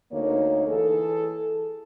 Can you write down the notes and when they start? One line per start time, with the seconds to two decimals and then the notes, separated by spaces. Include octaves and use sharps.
0.12 D2 A#3 D#4 C#5
0.67 E3 G#4 A4